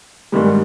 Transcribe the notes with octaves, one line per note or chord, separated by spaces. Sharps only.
G#2 D#3 G3